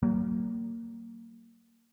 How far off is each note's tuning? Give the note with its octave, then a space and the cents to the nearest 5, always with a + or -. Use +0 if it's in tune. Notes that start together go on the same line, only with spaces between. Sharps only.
F#3 +40 A#3 -15